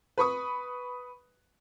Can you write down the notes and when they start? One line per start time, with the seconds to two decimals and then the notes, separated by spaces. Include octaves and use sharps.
0.18 B4 B5 C#6 D#6